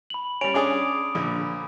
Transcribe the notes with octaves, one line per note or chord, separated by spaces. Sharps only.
B5 F#7
G3 C#4 G#5 D7 F7
C#4 D4 G#4 D6 D#6
A#1 D3